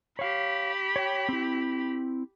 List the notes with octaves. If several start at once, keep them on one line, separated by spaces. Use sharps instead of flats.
G4 C#5 F5 B5
C#5 G5
C4 E4